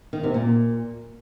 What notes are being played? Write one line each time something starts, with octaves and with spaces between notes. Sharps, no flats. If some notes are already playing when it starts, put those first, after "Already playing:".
D#3
C3
A#2